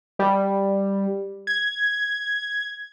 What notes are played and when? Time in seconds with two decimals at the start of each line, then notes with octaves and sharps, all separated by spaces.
0.19 G3
1.47 G#6